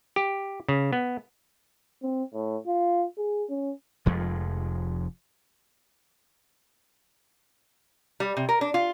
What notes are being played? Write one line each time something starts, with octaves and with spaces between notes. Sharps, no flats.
G4
C#3
B3
C4
A2
F4
G#4
C#4
F1 F2 F3 G#3
G3
C3
A#4
D4
F4